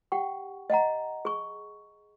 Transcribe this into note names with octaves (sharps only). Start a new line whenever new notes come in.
G4 F#5 G5 C#6
D#5 F5 F#5 A#5
G#4 C#6